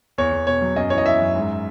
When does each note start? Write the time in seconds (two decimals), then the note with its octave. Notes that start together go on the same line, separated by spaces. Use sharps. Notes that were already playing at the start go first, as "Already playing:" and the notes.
0.18 E2 C#5
0.32 E2
0.47 B2 C#5
0.62 F#3
0.76 F#2 D#5
0.90 E3 C#5
0.98 D#5
1.06 E3 E5
1.20 F#2
1.35 G#2